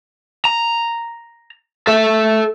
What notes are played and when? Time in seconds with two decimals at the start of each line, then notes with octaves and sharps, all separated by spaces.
0.45 A#5
1.87 A4 E5